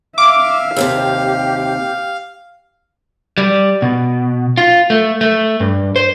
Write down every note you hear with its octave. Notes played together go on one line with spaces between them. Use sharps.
E5 F5 D6
D#2 A2 C3 G4
G3
B2
F4
A3
A3
G2
C5